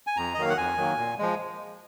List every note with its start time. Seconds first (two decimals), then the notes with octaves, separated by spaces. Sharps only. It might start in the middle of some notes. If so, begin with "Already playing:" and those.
0.07 G#5
0.17 F2 A#5
0.34 D#5
0.38 D#3 F#3 A#3 F5
0.49 F#5
0.58 F2 G#5
0.77 D#3 F#3 A#3
0.98 A#2
1.19 F3 G#3